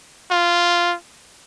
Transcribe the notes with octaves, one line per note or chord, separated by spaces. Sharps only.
F4